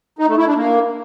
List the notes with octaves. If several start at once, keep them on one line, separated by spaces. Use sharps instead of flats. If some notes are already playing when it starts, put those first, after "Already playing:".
D#4
A3
E4
D4
A#3